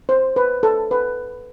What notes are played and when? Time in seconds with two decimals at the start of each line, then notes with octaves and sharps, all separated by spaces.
0.09 C5
0.36 B4
0.63 A4
0.91 B4